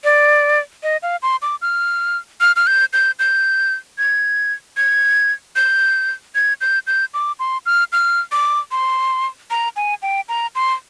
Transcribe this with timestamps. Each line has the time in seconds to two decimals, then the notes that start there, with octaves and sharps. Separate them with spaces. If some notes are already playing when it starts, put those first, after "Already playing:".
0.04 D5
0.83 D#5
1.03 F5
1.22 C6
1.42 D6
1.62 F6
2.41 F6
2.56 F6
2.67 G6
2.93 G6
3.19 G6
3.98 G#6
4.77 G#6
5.56 G6
6.35 G#6
6.61 G6
6.87 G6
7.14 D6
7.39 C6
7.66 F6
7.92 F6
8.32 D6
8.71 C6
9.51 A#5
9.76 G#5
10.02 G5
10.29 A#5
10.55 C6